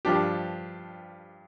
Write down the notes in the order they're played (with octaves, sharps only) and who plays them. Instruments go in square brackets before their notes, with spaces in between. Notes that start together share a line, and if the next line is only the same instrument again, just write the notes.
[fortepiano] G2 F3 D4 G4